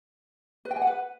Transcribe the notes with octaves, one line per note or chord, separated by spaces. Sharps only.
B4
G5
G#5
F#5
B4